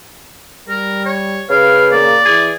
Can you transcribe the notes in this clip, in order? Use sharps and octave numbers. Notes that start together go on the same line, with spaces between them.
G3 A#4
C#5
C#3 B4 F5
A#3 D5
E3 G#4